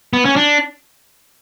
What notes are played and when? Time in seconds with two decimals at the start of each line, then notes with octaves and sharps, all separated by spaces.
0.13 B3
0.25 C#4
0.36 D4